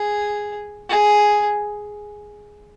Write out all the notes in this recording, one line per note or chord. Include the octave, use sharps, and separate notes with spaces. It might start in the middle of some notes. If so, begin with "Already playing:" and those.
Already playing: G#4
G#4